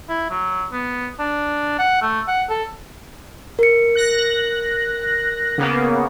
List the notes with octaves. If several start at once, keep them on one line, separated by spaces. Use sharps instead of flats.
E4
F#3
B3
D4
F#5
A3
F#5
A4
A#4 C#7
F#6 A#6
C#3 A#3 B3